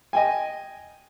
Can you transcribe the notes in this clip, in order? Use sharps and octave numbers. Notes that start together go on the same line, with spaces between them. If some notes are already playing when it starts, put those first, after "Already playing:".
D#5 G5 G#5